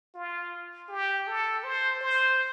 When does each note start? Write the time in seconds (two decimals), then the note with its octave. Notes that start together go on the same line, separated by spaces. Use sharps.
0.15 F4
0.89 G4
1.27 A4
1.64 C5
2.01 C5